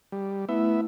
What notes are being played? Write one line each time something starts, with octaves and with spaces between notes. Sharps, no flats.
G3
A3 B3 E4 E5